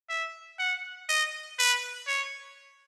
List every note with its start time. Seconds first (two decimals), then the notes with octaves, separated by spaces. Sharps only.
0.09 E5
0.59 F#5
1.09 D#5
1.59 B4
2.07 C#5